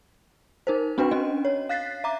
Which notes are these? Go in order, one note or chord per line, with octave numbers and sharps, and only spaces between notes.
D#4 A#4 C5
C4 D4 F#4 B4 G5
C#4 D4 D#5
C#5
F5 F#6 A6 B6 C7
E5 A#5 D6